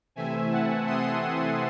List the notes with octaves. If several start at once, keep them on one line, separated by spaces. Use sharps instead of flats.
C3 E3 A3 C4 E5 G#5
F#5 A5
C6 D#6